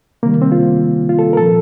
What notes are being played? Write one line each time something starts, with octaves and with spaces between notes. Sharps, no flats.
C3 D#3 G3 A#3
C4
F4
F4
A4
A#4
A#2 F3 A4